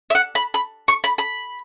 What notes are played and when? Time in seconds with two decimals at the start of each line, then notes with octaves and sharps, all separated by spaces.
0.10 E5
0.15 F#5
0.35 B5
0.54 B5
0.88 C#6
1.04 B5
1.18 B5